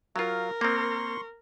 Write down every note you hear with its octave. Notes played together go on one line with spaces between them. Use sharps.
F#3 F4 A#4 F5
A#3 C4 C6 C#6